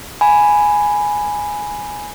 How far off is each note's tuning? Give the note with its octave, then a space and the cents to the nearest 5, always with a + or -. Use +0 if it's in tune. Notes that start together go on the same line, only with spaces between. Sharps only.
G#5 +0 B5 +0